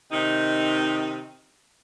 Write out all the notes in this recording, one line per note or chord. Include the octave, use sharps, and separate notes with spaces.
C3 D#3 D#4